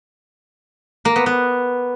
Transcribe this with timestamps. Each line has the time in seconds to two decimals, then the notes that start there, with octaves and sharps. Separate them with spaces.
1.05 A#3
1.16 B3
1.26 B3